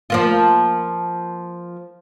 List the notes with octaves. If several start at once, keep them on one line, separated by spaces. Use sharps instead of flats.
F3 A#3 F4